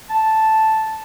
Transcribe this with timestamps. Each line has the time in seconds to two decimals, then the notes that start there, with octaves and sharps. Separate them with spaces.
0.10 A5